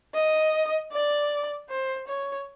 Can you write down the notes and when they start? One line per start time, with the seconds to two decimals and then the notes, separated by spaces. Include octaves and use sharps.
0.15 D#5
0.92 D5
1.69 C5
2.07 C#5